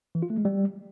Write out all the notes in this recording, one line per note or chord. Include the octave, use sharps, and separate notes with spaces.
E3
F4
A3
G#3
G3